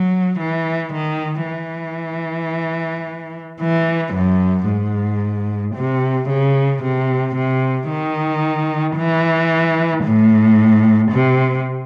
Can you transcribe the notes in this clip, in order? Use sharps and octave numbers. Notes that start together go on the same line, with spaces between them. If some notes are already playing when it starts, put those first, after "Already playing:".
Already playing: F#3
E3
D#3
E3
E3
F#2
G#2
C3
C#3
C3
C3
D#3
E3
A2
C3